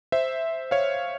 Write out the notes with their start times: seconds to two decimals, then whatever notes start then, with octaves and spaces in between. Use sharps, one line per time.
0.12 C5 E5
0.71 C#5 F5